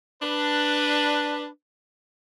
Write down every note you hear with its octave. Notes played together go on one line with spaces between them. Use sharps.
D4 B4